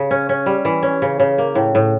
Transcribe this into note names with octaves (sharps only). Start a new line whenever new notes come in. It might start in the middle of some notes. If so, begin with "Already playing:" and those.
Already playing: C#3
C#4
C#4
G3
E3
C#4
C#3
C#3
A#3
A2
A2